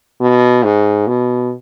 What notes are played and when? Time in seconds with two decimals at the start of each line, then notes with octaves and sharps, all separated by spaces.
0.21 B2
0.64 G#2
1.07 B2